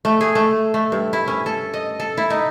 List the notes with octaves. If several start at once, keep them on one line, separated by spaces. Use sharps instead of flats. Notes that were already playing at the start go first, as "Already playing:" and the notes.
A3
G#4
A3
A3
G2
E4
C#4
A4
D#5
A4
E4
D#4